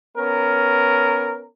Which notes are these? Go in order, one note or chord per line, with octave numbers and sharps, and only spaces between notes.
B3 C#4 A#4